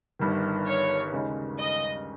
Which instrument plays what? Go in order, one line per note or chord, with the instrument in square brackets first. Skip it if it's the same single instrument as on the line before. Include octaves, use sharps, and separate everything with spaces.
[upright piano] G1 G2 D#3
[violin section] C#5
[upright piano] D#2 C#3 G#3 D#4
[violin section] D#5